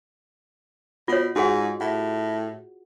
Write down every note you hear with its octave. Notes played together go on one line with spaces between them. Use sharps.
B2 F4 C#5
G#2 F#4 G#4 F#5
A2 F#5